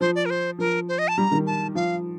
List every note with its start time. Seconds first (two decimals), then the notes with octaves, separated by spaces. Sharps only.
0.01 F3 C5
0.15 D5
0.25 A#4
0.30 C5
0.59 F3 A#4
0.88 C5
0.98 D#5
1.08 A5
1.18 G3 A#5
1.31 D#3
1.47 A5
1.75 F3 F5